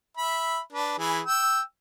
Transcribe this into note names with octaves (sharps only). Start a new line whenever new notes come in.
E5 B5
D4 B4
E3 G#4 B5
G5 E6